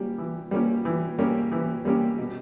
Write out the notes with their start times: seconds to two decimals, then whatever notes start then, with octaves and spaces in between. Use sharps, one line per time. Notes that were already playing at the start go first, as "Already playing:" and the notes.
Already playing: G3 A#3 C#4 G4
0.18 E3
0.51 G3 A#3 C#4 G4
0.85 E3
1.18 G3 A#3 C#4 G4
1.52 E3
1.85 G3 A#3 C#4 G4
2.19 B2